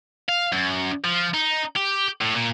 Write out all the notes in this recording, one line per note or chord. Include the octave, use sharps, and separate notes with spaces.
F5
F#2
F3
D#4
G4
A2
A#2